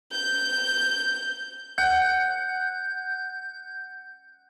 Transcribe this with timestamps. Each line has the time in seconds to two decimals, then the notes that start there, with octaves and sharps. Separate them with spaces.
0.12 G6
1.78 F#5 G6